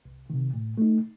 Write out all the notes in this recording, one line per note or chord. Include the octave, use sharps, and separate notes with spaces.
C2
C3 D#3
A2
A3 D#4